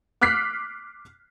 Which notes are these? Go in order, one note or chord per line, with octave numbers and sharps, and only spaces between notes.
D6 F6 F#6 B6 C7